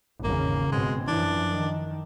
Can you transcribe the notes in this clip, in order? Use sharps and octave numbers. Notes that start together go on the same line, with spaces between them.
G#1 E2 C#3 A#3
G#2 B2 G#3 C4
F#2 E3 F3 D4
D#3